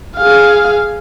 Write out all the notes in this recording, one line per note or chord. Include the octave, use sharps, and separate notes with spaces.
G#4 F5